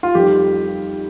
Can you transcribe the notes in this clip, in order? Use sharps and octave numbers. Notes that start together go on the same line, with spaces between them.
F4
F2 D#3 G3 G4